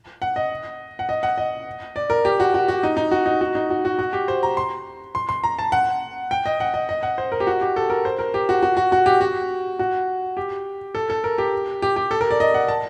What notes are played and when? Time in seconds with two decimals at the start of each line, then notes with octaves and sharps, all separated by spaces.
0.22 F#5
0.36 D#5
0.99 F#5
1.09 D#5
1.23 F#5
1.38 D#5
1.96 D5
2.10 A#4
2.25 G4
2.40 F#4
2.54 F#4
2.68 F#4
2.83 D#4
2.97 D#4
3.11 F#4
3.26 D#4
3.41 F#4
3.55 D#4
3.70 F#4
3.85 F#4
3.99 F#4
4.13 G4
4.28 C5
4.43 A#5
4.57 C6
5.15 C6
5.29 C6
5.44 A#5
5.59 A5
5.72 F#5
6.31 G5
6.46 D#5
6.60 F#5
6.74 D#5
6.89 D#5
7.03 F#5
7.18 C5
7.32 A#4
7.40 G4
7.47 F#4
7.61 G4
7.76 A4
7.90 A#4
8.05 C5
8.19 A#4
8.34 G4
8.49 F#4
8.63 F#4
8.77 F#4
8.92 F#4
9.06 G4
9.21 F#4
9.79 F#4
10.37 G4
10.95 A4
11.10 A4
11.24 A#4
11.38 G4
11.82 G4
11.96 G4
12.11 A4
12.21 A#4
12.31 D5
12.40 D#5
12.54 F#5
12.68 A5